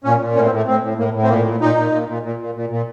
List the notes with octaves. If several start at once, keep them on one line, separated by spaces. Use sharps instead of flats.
A#2 C#4
A#2
A2 C#4
C4
A2
A3
A2 C4
A2
A2 A#3
A2
C4
A#2 A#3
A#2
A#2 D#4
A#2
A#2
A#2
A#2
A#2
A#2
A#2